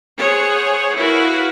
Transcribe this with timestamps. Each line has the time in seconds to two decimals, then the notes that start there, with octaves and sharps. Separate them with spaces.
0.18 G#4 C5 C#5 F#5
0.96 E4 F#4 A#4 B4 F5